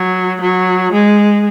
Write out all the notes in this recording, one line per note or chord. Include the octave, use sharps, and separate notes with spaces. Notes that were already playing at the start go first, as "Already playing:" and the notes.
Already playing: F#3
F#3
G#3